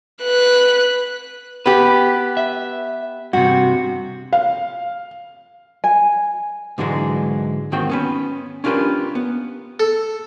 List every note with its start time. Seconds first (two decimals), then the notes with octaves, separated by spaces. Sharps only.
0.23 B4 F#6
1.66 B3 G4 B4
2.37 E5
3.33 G2 C3 F#4
4.33 F5
5.84 G#5
6.78 G#2 D3 E3 F#3 G#3
7.72 D#2 G#2 D#3 C4 F#4 G5
7.89 B3 C#4 B4
8.64 C#4 D4 F4 G4 A#4 B4
9.15 B3
9.80 A4